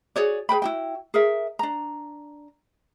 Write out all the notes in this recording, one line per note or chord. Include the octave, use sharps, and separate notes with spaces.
F#4 G#4 C#5 D5
G#4 B4 G5 B5
E4 F#4 G5
G#4 A#4 E5
D4 A#5